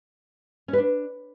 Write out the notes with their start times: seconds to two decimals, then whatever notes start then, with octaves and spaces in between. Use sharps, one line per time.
0.68 C#4
0.73 B4
0.78 D4